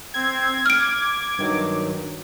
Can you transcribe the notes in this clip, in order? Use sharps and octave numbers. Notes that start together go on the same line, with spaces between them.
C4 G#6
D6 F6 D7
G2 D#3 F#3